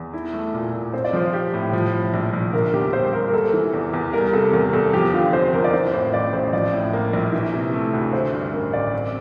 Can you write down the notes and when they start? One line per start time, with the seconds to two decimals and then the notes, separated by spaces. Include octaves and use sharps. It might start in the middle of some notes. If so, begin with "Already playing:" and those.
Already playing: E2
0.13 E4
0.33 A3
0.54 A#2
0.73 A#2
0.93 C4 C5
1.04 D5
1.13 F3 C5
1.33 G4
1.54 A2
1.73 F3
1.93 A2
2.14 A#1
2.34 A#1
2.53 D3 A#4
2.73 E2 G4
2.93 G3 C5
3.13 E1 A#4
3.28 A#4
3.33 A#3 A4
3.53 E3
3.73 E2
3.93 E2
4.13 G3 A#4
4.33 C3 A4
4.53 E2 A#4
4.73 E2 A4
4.93 F3 G4
5.13 D3 F4
5.33 C4 C5
5.53 F2 A#4
5.64 D5
5.73 E3 C5
5.93 A2 C5
6.13 A1 D5
6.33 A1 C5
6.53 F3 D5
6.73 A2
6.93 A#3
7.13 A#1
7.33 E3
7.53 C3
7.73 A3
7.93 D2
8.13 D3 C5
8.33 G2
8.53 A1 A#4
8.73 A1 D5
8.93 C4